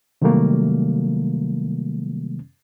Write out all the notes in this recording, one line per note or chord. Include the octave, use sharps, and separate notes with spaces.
C3 D#3 F#3 G3 A3 A#3